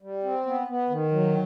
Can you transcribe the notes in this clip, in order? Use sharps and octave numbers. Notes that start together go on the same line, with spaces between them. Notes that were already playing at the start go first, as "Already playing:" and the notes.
G3
C4
B3
B3
D#3
F#3